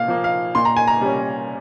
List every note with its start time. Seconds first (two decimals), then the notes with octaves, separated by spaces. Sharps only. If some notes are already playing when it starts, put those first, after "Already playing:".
Already playing: A#2 F5
0.08 F3 A#3
0.24 F5
0.55 A#2 C6
0.65 A#5
0.76 G#5
0.87 A#5
1.01 G3 C#4